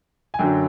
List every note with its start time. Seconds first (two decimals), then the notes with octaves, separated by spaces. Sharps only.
0.34 G#5
0.39 F#2 D3 F#3 G5